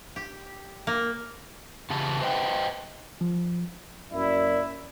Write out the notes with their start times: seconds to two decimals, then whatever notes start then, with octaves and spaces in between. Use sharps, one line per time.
0.16 G4
0.87 A#3
1.90 E2 C#3 G4 A5
2.21 B4 C5 D#5 F#5 G5
3.21 F3
4.12 F#2 A#3 E4 D5